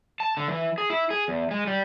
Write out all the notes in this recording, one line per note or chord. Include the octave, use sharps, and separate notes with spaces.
A5
D3
E3
G#4
E4
G#4
E2
G#3
G3